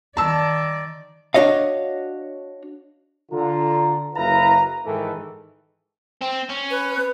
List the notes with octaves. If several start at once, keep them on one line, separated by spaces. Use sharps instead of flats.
D#3 D5 A5 E6
D4 F#4 C#5 D#5 F5
D3 F4 A#5
F#1 E4 B4 F5 A#5
G#2 D#3 E3 A4
C4
C#4
B4